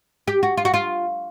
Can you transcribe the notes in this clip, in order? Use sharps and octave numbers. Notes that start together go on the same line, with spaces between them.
G4
F#4
F4
F#4
F4